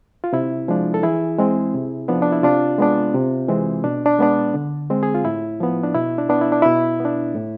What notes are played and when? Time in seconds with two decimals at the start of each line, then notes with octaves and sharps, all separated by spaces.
0.24 F4
0.33 C3 E4
0.68 F3 G#3 D4
0.94 A4
1.03 E3 E4 G#4
1.39 G#3 C4
1.74 C3
2.08 F3 B3 D4
2.22 D4
2.32 E4
2.43 C3 D4 F4
2.78 G#3 B3 D4
3.14 C3
3.49 E3 G#3 C4
3.84 B2 D4
4.06 D4
4.19 G#3 B3 D4
4.54 D3
4.90 G#3 C4
5.03 G#4
5.15 F4
5.24 A2 E4
5.60 F3 B3
5.83 D4
5.95 B2 E4
6.18 D4
6.29 B3 D4
6.41 E4
6.52 D4
6.62 B2 E4
7.00 B3 D4
7.35 A2